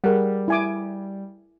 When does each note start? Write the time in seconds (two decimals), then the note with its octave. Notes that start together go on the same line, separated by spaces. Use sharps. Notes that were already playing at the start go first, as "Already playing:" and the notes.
0.04 G3 G#4 A#4 F#5
0.48 E4 G#5 D6